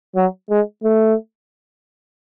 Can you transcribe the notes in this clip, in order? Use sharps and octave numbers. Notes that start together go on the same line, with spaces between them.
F#3
G#3
A3